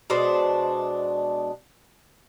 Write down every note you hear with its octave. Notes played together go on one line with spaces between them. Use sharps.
B2 G#3 D4 C5